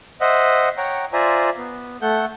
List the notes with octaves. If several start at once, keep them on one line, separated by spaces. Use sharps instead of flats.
C5 D#5 E5 F#5
C#5 F#5 G5 A#5
F4 C5 D5 E5 G#5 A#5
B3
A3 A4 F#5 G6